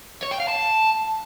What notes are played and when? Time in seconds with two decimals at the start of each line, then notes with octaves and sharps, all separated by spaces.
0.23 C#5
0.31 G5
0.40 F5
0.48 A5